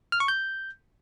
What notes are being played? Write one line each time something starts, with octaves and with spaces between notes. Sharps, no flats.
F6
C#6
G6